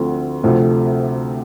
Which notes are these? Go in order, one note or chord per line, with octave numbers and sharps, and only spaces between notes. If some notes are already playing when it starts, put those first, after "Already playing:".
Already playing: D2 D3 F3 C4
D2 C3 F3 A3 C4